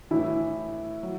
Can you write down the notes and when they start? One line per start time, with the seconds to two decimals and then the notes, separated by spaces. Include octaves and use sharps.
0.11 A2 E3 E4
1.03 F#3